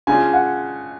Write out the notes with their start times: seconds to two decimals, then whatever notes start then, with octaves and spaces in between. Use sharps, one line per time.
0.07 C#3 G#3 D4 F4 G#5
0.33 F#5